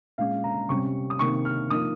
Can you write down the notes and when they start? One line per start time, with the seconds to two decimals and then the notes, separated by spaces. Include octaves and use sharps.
0.18 A#2 G#3 C#4 F5
0.44 A#5
0.69 C3 G3 C#4 C#6
1.10 D#6
1.19 C3 D#3 A#3 C#6
1.45 F6
1.70 F3 A#3 D#4 D#6